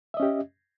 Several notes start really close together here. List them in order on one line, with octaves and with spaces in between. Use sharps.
E5 D#5 C#4 G4